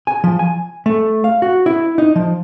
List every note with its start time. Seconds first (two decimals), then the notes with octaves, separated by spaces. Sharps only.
0.07 G#5
0.24 F3
0.39 G#5
0.86 A3
1.24 F5
1.42 F#4
1.66 E4
1.98 D#4
2.16 F3